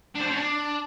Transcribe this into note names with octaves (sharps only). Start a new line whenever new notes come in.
D4
C5
D4
C#4
D4